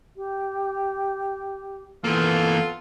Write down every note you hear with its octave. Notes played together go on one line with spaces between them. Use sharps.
G4
E3 A#3 B3 F4 A4